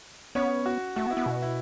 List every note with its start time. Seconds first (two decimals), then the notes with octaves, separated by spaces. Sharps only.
0.35 B3 C#4 C#5
0.66 F#4
0.96 A3 F#4
1.06 B3
1.11 E4
1.17 B3
1.26 B2 F#4
1.42 E4 E5